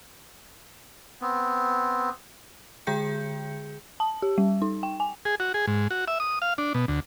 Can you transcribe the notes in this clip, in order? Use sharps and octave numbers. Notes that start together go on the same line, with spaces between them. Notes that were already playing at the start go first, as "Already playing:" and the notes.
B3 C4
D3 G#3 G#4 G5 G6 C#7
A5
G4
G3
D#4
G5
G#5
G#4
F#4
G#4
G#2
F#4
E5
D#6
F5
D4
B2
D2